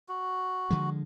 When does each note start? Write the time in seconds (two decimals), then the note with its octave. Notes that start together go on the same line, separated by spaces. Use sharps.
0.09 F#4
0.70 D3 F3 G#3